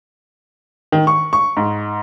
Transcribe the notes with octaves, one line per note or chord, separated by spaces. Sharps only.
D#3
C#6
C#6
G#2